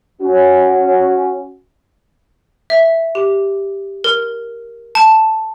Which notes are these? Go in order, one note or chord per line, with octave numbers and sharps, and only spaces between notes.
C#4 F#4
E5
G4
A#4
A5